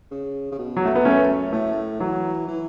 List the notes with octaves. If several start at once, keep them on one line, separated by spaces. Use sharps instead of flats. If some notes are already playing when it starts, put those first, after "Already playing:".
C#3
C#3
B2
F#3
A3
B3
F#2 A3 C#4
A2 A3
E3 F#3
E3